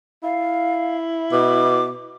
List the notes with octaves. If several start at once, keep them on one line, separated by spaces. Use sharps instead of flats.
E4 F5
B2 D6